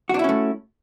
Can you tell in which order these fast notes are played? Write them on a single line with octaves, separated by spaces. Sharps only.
F#4 D4 E4 C#4 A3